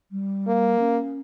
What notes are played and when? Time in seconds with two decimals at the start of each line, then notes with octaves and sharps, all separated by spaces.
0.11 G3
0.47 A#3
0.79 C#4